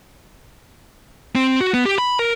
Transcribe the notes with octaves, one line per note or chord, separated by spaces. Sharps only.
C4
F#4
B3
G4
B5
A#4